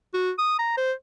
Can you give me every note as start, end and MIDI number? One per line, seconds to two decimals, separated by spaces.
0.14 0.31 66
0.39 0.56 87
0.59 0.74 82
0.78 0.93 72